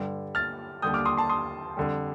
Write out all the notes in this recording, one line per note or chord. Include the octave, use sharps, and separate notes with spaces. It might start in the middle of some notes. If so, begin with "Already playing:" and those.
Already playing: G2 D3 G3
F6 A6
D#2 D3 G3 D#6 G6
D6 F6
C6 D#6
A5 C6
C6 D#6
F2 D3 G3